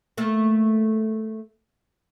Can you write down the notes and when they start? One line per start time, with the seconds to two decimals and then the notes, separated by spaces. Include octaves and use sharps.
0.18 A3 A#3